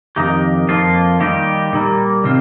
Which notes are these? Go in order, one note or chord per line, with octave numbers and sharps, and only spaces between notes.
F2 D#3 A#3 D#4 G4
F2 F3 A#3 F4
D#3 G3 A#3 D#4 G4
A#2 G3 A#3
C3 D#3 C4 F4